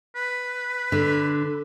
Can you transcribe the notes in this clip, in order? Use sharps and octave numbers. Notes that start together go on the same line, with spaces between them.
B4
D3